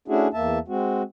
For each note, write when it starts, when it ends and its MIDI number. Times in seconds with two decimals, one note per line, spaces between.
0.08 0.28 57
0.08 0.28 61
0.08 0.28 62
0.08 0.28 64
0.08 0.28 66
0.08 0.28 68
0.34 0.59 40
0.34 0.59 58
0.34 0.59 76
0.34 0.59 81
0.68 1.03 56
0.68 1.03 60
0.68 1.03 66